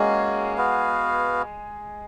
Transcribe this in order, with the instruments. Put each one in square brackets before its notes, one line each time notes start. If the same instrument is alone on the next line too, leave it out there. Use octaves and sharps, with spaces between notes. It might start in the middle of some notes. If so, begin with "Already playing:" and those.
Already playing: [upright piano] G#3 G#4 [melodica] A#3 C#4 F#4
[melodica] B3 F#4 B4 F5